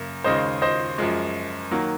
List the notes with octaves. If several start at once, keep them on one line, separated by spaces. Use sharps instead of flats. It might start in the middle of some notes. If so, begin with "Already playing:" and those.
Already playing: F#2 C#3 A#3
D#2 C#3 G#3 C5 D#5
C5 D#5
F#2 F3 G#3
D#3 F#3 A#3